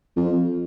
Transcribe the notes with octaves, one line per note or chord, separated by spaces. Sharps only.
F2